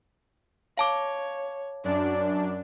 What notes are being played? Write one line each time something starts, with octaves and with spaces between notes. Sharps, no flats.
C#5 F5 A5 D6
F#2 D4 D5